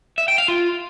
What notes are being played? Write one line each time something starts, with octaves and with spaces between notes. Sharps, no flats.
E5
G5
F5
F4